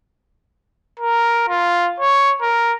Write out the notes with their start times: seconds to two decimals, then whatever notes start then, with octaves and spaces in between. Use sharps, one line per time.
0.99 A#4
1.49 F4
2.00 C#5
2.42 A#4